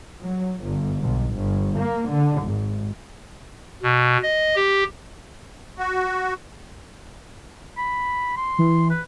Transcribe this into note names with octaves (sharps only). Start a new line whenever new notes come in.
F#3
G1
B1
G1
A#3
D3
G#1
B2
D#5
G4
F#4
B5
C6
E3
B4